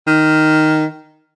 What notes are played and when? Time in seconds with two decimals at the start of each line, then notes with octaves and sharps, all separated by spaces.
0.07 D#3